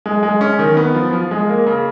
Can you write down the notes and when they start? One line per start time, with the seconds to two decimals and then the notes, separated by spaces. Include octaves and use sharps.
0.06 G#3
0.23 G#3
0.41 C#4
0.59 D#3
0.77 B3
0.95 F3
1.13 F3
1.31 G#3
1.49 A#3
1.67 C#3